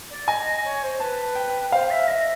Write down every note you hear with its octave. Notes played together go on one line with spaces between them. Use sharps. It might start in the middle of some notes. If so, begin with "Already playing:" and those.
D5
D#5 G#5
C#5
C5
B4 A5
G5
C5 F5
E5
D#5 E5